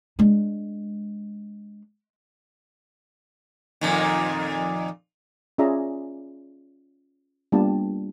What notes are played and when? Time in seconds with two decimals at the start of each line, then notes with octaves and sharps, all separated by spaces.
0.19 G#3 D4
3.81 F2 A#2 D#3
5.58 C#4 F4 G#4 D5 E5 A#5
7.52 G3 A#3 B3 D4 F4 A5